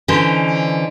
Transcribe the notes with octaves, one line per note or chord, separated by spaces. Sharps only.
D3 E3 C#4 D#4 C5